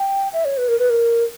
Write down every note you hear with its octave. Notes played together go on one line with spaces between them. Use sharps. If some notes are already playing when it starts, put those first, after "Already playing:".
Already playing: G5
E5
C#5
B4
A#4
B4
A#4